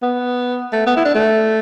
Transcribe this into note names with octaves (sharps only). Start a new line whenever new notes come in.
B3
A3
B3
E4
D4
A3